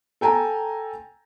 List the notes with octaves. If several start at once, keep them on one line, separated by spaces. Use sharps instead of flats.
A4 G5 G#5 A#5